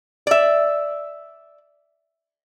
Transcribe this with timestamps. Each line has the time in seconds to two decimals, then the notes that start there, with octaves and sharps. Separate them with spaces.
0.27 D5 E5